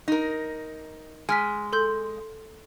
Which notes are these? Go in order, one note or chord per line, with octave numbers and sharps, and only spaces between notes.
D#4 A#4
G#3 G#5 F6 B6
A4 C6 G6